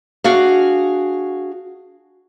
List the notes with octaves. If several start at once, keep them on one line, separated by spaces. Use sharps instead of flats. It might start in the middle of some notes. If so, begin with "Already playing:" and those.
D4 F#4 G#4 F5